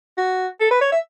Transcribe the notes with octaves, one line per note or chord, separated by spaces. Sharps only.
F#4
A4
B4
C#5
E5